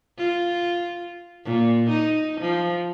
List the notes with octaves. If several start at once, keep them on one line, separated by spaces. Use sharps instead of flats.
F4
A#2
D#4
F3